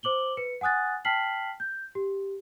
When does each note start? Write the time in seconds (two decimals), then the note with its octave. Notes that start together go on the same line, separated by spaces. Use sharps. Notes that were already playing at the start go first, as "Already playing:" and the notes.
0.03 C5 D6 F#7 G7
0.37 B4 C#7
0.61 F#5 G#5 D#6 F#6 A6
1.05 G5 A5 F6 B6 C7 F#7
1.60 G6
1.95 G4